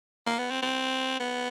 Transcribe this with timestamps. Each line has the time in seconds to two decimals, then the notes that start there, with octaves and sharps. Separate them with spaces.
0.27 A#3
0.39 B3
0.50 C4
0.62 C4
1.19 B3